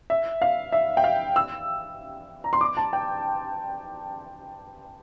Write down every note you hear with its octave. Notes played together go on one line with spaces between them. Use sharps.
E5
F5
E5
G5
F5
E6
A#5
C6
D6
A5
G5